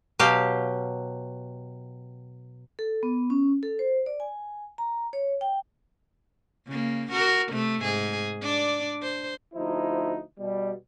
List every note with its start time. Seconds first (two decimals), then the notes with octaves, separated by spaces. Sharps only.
0.19 B2 F#3 G4 F5
2.79 A4
3.03 B3
3.30 C#4
3.63 A4
3.79 C5
4.06 D5
4.20 G#5
4.78 A#5
5.13 C#5
5.41 G5
6.67 C#3 A#3
7.12 F#4 A#4
7.52 C3 A3
7.82 G#2 G#4
8.42 D4 D5
9.02 C5
9.55 D2 F3 D#4 E4 C5
10.39 B2 G3